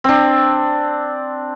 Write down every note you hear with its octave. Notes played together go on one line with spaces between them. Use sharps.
C4 D4